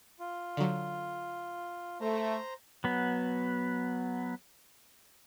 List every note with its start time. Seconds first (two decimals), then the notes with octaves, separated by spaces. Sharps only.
0.20 F4
0.57 D3 F#3
2.01 A3 C5 A#5
2.84 F#3 B3